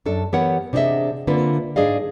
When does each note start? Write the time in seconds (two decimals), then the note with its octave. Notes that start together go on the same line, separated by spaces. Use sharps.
0.06 F#2 D4 A4
0.33 E3 B3 G4 A#4 C#5 F#5
0.73 C3 D4 G#4 A4 D#5 E5
1.27 D3 A#3 C4 F4 B4
1.76 G#2 D4 G#4 D5 D#5 F5